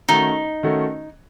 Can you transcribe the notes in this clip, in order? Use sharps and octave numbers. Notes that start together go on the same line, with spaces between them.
D#3 A3 C#4 D#4 F#4 A4
D#3 A3 C#4 F#4 A4